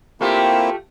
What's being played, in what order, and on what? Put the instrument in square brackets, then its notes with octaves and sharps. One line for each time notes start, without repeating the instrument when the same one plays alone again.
[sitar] A3 F4 G4 [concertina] A#3 C4 E4